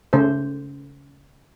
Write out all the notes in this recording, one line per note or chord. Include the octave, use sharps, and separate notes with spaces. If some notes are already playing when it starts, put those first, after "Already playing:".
C#3 A3 C5